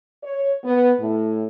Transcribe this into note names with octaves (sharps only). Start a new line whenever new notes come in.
C#5
B3
A2